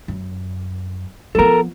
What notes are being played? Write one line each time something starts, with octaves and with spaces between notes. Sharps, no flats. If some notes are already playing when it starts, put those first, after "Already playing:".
F#2
F3 B3 A4 A#4